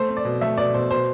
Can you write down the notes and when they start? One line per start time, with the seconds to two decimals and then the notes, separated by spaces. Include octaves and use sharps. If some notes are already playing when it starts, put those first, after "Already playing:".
Already playing: A3 C5
0.09 C4
0.17 D5
0.25 B2
0.41 A3 E5
0.57 B2 D5
0.74 B2 C5
0.91 B2 C5